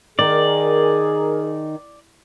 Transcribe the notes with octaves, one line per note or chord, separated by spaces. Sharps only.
D#3 G#4 A#4 D5